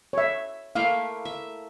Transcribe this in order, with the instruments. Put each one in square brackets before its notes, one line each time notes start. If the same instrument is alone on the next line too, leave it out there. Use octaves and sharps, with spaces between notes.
[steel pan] C#5 E5
[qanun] A3 A#3 E4 [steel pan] F5
[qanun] E5